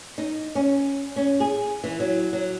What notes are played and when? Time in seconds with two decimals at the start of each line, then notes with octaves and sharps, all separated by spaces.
0.18 D#4
0.55 C#4
1.16 C#4
1.40 G#4
1.84 E3
2.00 F#3
2.33 F#3